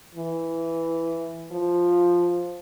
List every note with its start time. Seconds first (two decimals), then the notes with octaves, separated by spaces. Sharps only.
0.15 E3
1.52 F3